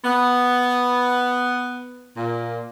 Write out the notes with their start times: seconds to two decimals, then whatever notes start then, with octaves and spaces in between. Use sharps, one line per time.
0.04 B3
2.16 A#2